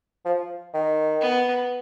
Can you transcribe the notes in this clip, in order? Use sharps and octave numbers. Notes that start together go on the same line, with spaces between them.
F3
D#3
B3